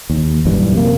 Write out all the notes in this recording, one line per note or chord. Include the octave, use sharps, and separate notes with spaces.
D#2
A#1 F#2 E3 G3
C3 A#3